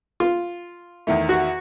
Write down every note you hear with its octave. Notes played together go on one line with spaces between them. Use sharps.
F4
E2 D#3 A3
F#4